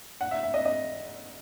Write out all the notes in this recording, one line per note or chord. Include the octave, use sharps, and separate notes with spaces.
F#5
E5
E5
D#5
D#5